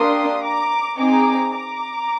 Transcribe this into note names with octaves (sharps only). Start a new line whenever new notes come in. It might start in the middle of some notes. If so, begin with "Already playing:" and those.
Already playing: A#3 D4 G4 C6 D#6
A#5 D6
C4 D#4 G#4 A#5 D6
A#5 D6